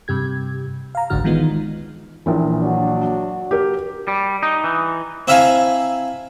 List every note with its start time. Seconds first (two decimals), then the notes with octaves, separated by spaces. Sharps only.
0.08 G2 C3 G4 G#6
0.95 F5 A#5
1.10 G1 C2 G#2 D3 F#4 F6
1.24 D#3 E3 G#3 B3 D#4 F4
2.26 A#1 A#2 E3
2.60 F#3 D4 F#4
3.51 G4 A#4
4.08 G3
4.43 D#4
4.64 E3
5.28 C4 E4 E5 F5 G#5 A#5